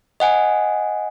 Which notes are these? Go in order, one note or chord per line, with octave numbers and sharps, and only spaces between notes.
D#5 F#5 G#5